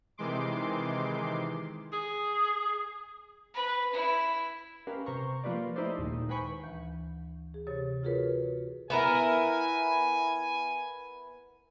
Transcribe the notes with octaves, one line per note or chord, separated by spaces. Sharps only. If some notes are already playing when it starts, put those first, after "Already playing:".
C3 D#3 E3 G#3 C6 D6
G#4
B4
E4
C#4 G4 A#4 B4 F5
C3 C5 A#5 C#6
F3 A#3 F4 G4 B4 D5
A3 D#4 E4 G4 C5 D5
D#2 A#2 D#3 G#3 D#4
B4 C5 G5 G#5 B5 C#6
D2 E3
G#4
C3 G4 C#5 A6
F4 F#4 G#4 A#4 B4 C#5
B3 E4 A#4 G#5